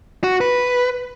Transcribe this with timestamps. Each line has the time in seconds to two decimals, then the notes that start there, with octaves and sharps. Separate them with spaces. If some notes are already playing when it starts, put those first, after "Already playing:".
0.24 F#4
0.41 B4